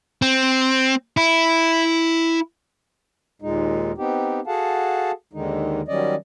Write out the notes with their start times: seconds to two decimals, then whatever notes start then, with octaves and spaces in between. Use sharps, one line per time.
0.22 C4
1.17 E4
3.41 D#2 A#2 G#3 D#4
3.98 B3 C4 D#4 G4
4.47 F#4 G#4 A4 F5 F#5 A5
5.33 D#2 D3 D#3 G#3 D#4
5.88 D#3 F#3 G3 C#4 D5 D#5